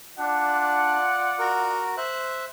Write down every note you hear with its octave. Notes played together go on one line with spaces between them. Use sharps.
D4 F4 D5 F#5
F#4 A#4
C5 E5 F#6